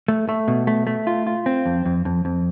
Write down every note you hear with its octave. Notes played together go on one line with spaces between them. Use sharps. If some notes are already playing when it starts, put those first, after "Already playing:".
A3
A3
B2
A3
A3
F4
F4
C4
F2
F2
F2
F2